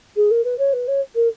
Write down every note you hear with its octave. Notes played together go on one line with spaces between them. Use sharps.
G#4
A#4
B4
C#5
B4
C#5
A#4